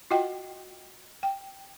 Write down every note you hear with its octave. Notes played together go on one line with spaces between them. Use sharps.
F4 F#4 D#5 F#5 G5
G5